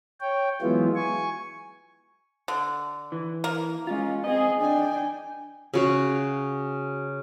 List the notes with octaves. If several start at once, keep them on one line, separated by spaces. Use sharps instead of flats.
C#5 G5
E3 F#3 G#3 B3 E4 F4
G#5 C#6
D3
E3
A#3
G#3 C#4 F4
C4 G#4 D#5
D4 G5 G#5
C#3 F#4 F5